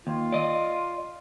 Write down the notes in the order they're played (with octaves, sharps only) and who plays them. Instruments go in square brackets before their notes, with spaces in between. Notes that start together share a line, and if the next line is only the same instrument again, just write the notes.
[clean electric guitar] D#2 [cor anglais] F4
[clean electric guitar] D5 D#5